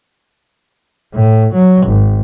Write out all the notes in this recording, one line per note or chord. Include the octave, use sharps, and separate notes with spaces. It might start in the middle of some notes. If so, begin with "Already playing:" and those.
A2
F#3
G#1